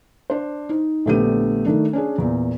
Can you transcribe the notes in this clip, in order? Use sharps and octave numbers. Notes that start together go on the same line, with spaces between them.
D4 C5
D#4
A#1 D3 A3 B3 G4 D#7
D#3 A3 D4
C#4 D4 G#4
E2 A#2